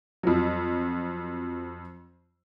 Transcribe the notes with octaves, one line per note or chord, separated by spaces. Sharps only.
F2 F3 F#3